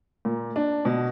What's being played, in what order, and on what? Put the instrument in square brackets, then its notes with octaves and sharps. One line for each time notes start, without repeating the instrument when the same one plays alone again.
[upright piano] A#2
D4
B2